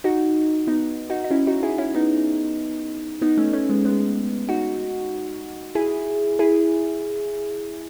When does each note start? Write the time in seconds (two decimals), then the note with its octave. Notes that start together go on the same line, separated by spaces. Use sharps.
0.04 D#4 F#4
0.67 B3 D#4
1.10 D#4 F#4
1.24 D#4
1.31 C#4 E4
1.47 D#4 F#4
1.63 E4 G#4
1.78 C#4 E4
1.95 B3 D#4
3.22 B3 D#4
3.37 A3 C#4
3.53 A3 C#4
3.69 G#3 B3
3.85 G#3 B3
4.49 D#4 F#4
5.75 E4 G#4
6.39 E4 G#4